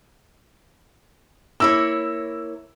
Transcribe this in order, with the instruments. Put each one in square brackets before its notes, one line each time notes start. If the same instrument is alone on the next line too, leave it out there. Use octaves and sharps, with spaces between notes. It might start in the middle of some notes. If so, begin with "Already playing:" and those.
[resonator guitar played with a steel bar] A#3 E4 C#5 [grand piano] E6